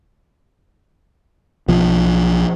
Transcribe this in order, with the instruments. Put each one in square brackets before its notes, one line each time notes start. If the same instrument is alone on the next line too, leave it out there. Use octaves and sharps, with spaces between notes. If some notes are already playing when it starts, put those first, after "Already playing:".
[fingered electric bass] B1 F3